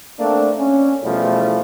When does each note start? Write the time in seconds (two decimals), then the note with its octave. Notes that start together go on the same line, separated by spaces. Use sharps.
0.20 A3 A#3 C4 D4
0.57 C#4
1.03 E2 B2 E3 F3 G3 A3